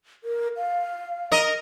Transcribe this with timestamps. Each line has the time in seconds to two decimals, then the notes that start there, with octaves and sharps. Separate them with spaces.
0.24 A#4
0.57 F5
1.32 A#4 D#5